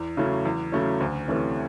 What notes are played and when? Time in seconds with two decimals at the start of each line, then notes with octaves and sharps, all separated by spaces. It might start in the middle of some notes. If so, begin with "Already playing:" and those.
Already playing: E2
0.17 C#3 F#3 A3 C#4
0.45 E2
0.72 C#3 F#3 A3 C#4
1.00 D2
1.28 C3 E3 A3 C#4